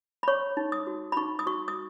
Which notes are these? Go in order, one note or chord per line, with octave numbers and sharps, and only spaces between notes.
B5
C#5 C#6
D#4
D#6
F#4
B5
D#4 C#6
D#6
F#4 C#6
D#6